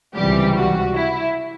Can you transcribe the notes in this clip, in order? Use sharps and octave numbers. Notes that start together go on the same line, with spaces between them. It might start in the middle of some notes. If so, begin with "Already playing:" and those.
C#2 C3 E3 G3 G4
F#4
E4